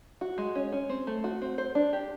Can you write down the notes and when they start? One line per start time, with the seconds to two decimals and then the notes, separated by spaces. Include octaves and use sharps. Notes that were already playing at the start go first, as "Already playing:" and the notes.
0.21 F#4
0.38 G#3
0.55 C#4
0.72 C#4
0.89 C4
1.07 A3
1.24 F#4
1.42 C4
1.58 C5
1.75 D4
1.93 G4